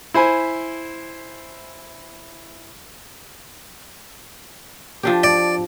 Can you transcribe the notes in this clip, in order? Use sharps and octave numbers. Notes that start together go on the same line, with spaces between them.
E4 C5 G#5 B5
F3 D4 G4
D5